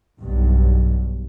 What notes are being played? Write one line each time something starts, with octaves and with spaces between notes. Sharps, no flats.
B1 G2